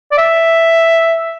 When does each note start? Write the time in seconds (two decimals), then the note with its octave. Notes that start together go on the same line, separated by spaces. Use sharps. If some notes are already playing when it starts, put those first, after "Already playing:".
0.11 D5
0.18 E5